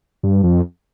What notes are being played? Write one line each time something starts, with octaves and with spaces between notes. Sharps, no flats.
G2
F2